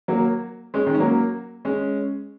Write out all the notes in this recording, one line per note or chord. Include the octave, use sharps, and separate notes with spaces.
F#3 A#3
G#3 C#4
D#3 G#3
C#4
F#3 A#3
G#3 C#4